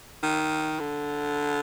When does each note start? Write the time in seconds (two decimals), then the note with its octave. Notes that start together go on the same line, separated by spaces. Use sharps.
0.23 D#3
0.80 D3